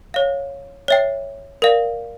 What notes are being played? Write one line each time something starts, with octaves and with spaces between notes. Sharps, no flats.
C#5 F5
C#5 E5 G5
A#4 D5 F5